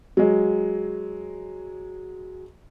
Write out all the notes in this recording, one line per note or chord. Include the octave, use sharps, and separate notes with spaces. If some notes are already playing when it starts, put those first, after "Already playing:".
F#3 G#3